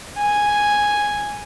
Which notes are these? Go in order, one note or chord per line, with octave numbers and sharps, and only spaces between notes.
G#5